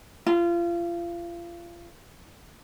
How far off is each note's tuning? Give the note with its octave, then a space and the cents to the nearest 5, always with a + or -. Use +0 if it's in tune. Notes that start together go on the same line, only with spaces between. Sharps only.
F4 -30